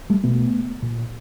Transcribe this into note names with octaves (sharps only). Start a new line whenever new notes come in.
G3 A3
B2 A3 B3
A#2